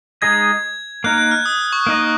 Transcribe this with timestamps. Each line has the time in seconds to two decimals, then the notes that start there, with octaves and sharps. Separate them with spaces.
0.22 G#3 D#4 G#4 D#5 G#6
1.04 A#3 D#4 A#4 F#6
1.18 F#6
1.31 F6
1.46 D#6
1.73 C#6
1.87 A#3 D#4 A#4 D#5